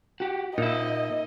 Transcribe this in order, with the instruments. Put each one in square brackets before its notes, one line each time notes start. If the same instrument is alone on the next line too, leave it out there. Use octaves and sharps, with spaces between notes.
[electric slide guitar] F#4 G4
[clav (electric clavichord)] A#2 [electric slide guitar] D#4 E5 [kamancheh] D#5